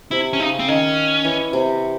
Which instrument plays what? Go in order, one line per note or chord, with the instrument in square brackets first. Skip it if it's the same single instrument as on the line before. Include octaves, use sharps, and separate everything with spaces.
[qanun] C3 [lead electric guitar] E4
[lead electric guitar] C#4
[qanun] C#3 [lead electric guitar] D#4
[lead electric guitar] C4
[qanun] D#3 [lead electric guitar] C#4
[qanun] E3
C3